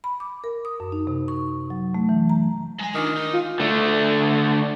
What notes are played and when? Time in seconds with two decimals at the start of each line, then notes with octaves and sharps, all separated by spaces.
0.04 B5
0.20 D6
0.44 A#4
0.65 D#6
0.80 F#2
0.92 D#4
1.07 C3
1.28 C#6
1.70 F#3
1.94 A3
2.09 E3
2.29 A#5
2.79 G#3 G#5
2.95 D#3 D4 F4
3.17 D#4
3.33 F4
3.60 D3 A3